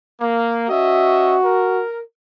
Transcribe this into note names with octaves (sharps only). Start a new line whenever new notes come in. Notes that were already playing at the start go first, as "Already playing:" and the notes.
A#3
C#4 F#4 D#5 E5
A#4